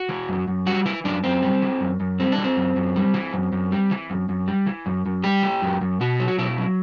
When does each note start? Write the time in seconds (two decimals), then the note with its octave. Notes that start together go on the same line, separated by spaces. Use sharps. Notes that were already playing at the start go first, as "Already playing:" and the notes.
Already playing: F#4
0.09 E3
0.29 F#2
0.48 F#2
0.67 G3 F#4
0.86 E3 E4
1.04 F#2 D4
1.24 F#2 C4
1.42 G3
1.62 E3
1.81 F#2
2.00 F#2
2.20 G3 C4
2.32 D4
2.38 E3
2.44 C4
2.57 F#2
2.76 F#2
2.96 G3
3.14 E3
3.33 F#2
3.53 F#2
3.72 G3
3.91 E3
4.10 F#2
4.29 F#2
4.48 G3
4.67 E3
4.86 F#2
5.06 F#2
5.24 G3 G4
5.43 E3
5.62 F#2
5.81 F#2
6.01 B2 F#4
6.20 F#3
6.28 F#4
6.38 B2 E4
6.58 F#3